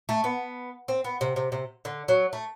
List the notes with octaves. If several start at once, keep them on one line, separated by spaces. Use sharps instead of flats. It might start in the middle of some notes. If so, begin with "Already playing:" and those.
A3
B3
C4
B3
C3
C3
C3
D3
F#3
A3